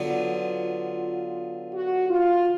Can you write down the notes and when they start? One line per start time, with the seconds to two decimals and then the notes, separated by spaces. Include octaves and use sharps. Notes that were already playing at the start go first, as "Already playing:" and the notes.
Already playing: D3 F#3 B3 F4
1.74 F#4
2.10 F4